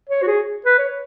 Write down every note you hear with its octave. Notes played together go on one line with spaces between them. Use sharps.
C#5
F#4
G#4
B4
C#5